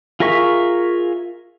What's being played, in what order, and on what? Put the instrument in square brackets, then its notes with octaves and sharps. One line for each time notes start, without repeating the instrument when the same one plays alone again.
[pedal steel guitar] F4 G#4 A#4 E5 C#6